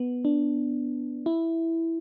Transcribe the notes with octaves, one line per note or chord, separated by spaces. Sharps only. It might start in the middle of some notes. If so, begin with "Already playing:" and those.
Already playing: B3
D4
E4